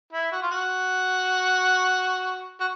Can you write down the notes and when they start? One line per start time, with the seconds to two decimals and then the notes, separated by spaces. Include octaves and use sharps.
0.13 E4
0.32 F#4
0.42 F4
0.51 F#4
2.60 F#4